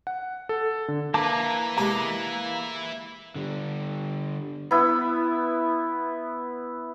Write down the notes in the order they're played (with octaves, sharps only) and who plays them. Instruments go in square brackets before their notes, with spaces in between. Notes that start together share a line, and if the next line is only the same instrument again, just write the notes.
[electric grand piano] F#5
A4
D3
[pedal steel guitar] A#3 D6 [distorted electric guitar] E4 B4 [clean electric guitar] A5
[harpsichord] G#3 G4 [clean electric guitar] A#5
[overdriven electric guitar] D3 G3
[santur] B3 E4